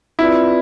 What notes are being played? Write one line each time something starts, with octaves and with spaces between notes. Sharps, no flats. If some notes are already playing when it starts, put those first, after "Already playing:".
C4 E4 F4 B4 D5